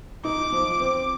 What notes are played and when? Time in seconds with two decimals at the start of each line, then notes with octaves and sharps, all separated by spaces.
0.25 D#4 D6
0.52 F3
0.80 C4